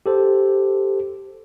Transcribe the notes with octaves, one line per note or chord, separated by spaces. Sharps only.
G4 A4 C5